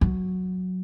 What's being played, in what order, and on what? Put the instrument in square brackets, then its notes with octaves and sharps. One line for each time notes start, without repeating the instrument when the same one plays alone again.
[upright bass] F#3